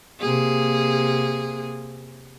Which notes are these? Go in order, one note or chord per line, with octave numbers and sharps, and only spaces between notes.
C3 A#3 G#4